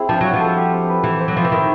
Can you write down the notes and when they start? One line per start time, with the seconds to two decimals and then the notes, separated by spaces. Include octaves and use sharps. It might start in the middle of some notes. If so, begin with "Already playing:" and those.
Already playing: C4 E4 G#4
0.08 F3 D4
0.21 F#3 F#4
0.33 F3
0.40 A4
0.57 G4
0.72 C4
0.88 B4
1.04 E3 G4
1.20 C5
1.28 F#3
1.36 F3 E4
1.45 E3
1.52 D#3 E4